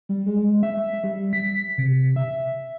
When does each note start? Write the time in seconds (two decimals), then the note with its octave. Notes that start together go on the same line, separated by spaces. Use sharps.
0.09 G3
0.26 G#3
0.63 E5
1.04 G3
1.33 B6
1.78 C3
2.16 E5